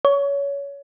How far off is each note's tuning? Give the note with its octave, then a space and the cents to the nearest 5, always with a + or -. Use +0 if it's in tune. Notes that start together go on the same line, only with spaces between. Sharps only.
C#5 +20